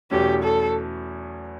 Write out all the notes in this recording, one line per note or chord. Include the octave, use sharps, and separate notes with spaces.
E2 B2 F#3 A3 C#4 G4
A4